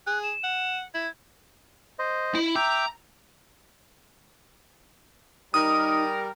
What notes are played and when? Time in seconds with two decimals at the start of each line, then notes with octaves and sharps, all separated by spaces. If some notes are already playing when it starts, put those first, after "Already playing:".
0.07 G#4 F#6
0.24 E7
0.44 F#5
0.94 E4 G#6
1.99 C5 D#5
2.35 E4
2.55 E5 G5 A#5 D6
5.54 G3 D#4 A#4 D#6